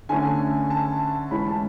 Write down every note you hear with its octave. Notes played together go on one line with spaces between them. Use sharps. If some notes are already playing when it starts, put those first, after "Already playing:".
D3 A3 C#4 G#5
A5
E3 G#3 C#4 B5
A5